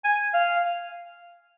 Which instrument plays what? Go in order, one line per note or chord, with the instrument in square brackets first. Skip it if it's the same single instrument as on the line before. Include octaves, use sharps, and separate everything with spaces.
[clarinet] G#5
F5